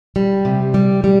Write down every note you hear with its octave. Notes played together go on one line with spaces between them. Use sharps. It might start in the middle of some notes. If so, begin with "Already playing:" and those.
G3
C3
G3
G3